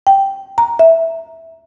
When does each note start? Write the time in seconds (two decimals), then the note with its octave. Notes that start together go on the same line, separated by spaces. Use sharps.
0.07 G5
0.58 A#5
0.79 E5